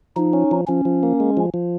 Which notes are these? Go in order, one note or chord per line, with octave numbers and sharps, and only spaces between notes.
F3 D#4
C#4
F3
F3 C#4
F3
A#3
G#3
F3
F3